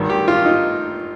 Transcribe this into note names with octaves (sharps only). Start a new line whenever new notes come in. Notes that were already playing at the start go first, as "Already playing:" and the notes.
Already playing: G#1 G2 D#3
G4
F4
D#4